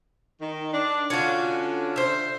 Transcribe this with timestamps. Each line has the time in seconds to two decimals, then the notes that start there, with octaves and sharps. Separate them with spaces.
0.40 D#3
0.71 D4
1.10 D3 C#4 F4 F#4
1.96 C5 E5